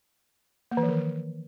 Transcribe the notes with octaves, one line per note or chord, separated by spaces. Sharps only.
A#3
E3
F3
D#3